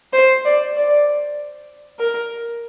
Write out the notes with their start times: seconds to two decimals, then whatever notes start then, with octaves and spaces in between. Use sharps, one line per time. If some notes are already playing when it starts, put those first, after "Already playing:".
0.13 C5
0.45 D5
0.76 D5
1.99 A#4